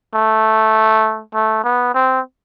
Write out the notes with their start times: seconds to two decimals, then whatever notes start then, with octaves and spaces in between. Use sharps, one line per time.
0.15 A3
1.34 A3
1.64 B3
1.94 C4